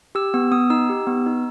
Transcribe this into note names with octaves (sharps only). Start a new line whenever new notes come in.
G4 E6
B3 E6
B3 D#6
D#4 E6
G4
B3
D#4